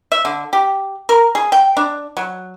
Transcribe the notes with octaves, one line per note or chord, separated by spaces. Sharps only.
E5
D3
G4
A#4
G#4
G5
D4
F#3